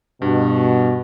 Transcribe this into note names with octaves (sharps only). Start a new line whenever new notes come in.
G2 B2